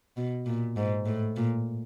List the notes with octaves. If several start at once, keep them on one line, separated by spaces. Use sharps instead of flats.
B2
A#2
G#2
A2
A#2